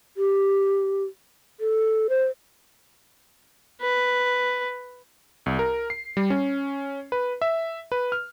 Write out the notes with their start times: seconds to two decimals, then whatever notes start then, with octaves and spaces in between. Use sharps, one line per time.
0.17 G4
1.60 A4
2.10 C5
3.83 B4
5.46 C2
5.59 A#4
5.90 C7
6.17 G3
6.30 C#4
7.12 B4
7.41 E5
7.92 B4
8.12 F6